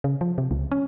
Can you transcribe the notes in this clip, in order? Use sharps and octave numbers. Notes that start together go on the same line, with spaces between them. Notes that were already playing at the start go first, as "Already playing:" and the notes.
C#3
F3
C3
C#2
C#4